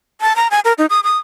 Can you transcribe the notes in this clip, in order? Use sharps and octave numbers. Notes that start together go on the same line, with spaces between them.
A5
A#5
G#5
A#4
D#4
D#6
D#6